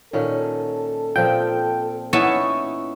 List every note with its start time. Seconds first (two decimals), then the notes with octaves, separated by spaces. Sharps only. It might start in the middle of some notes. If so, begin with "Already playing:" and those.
0.13 A#2 D#3 C#4 A4
1.16 A#2 F3 C4 G5
2.13 B3 C#4 D#4 E4 A5 C#6